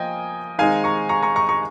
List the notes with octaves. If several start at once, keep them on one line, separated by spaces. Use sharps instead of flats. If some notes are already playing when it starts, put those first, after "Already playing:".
Already playing: F3 A#3 F4 D#5 G5 G#5
D#3 G#3 C4 D#4 F5 G#5
A#5 C#6
A#5 C#6
A#5 C#6
A#5 C#6
A#5 C#6